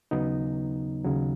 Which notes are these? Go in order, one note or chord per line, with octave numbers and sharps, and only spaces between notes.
D#2 C#3 F#3 B3 D#4
D#2 C#3 F#3